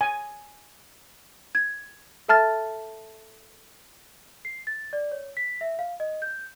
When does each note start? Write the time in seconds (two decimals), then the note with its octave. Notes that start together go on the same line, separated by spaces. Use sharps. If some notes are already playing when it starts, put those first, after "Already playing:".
0.01 G#5
1.55 G#6
2.28 A4 E5 A5 F6 A6
4.45 C7
4.67 A6
4.93 D5
5.12 C#5
5.37 B6
5.61 E5
5.79 F5
6.00 D#5
6.22 G6